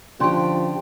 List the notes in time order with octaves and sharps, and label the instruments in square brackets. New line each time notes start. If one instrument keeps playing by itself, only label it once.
[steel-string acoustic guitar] D3 G4 [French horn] F3 [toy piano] C#4 C6 C#6